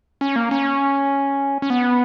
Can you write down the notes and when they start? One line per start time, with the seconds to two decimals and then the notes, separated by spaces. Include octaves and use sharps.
0.21 C#4
0.36 A#3
0.51 C#4
1.62 C#4
1.70 B3